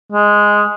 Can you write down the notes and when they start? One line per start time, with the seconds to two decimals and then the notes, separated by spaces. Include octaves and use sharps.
0.12 G#3